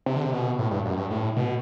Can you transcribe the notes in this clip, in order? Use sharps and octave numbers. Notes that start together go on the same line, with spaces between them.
C3
D3
C3
B2
A2
G2
F#2
G2
A2
B2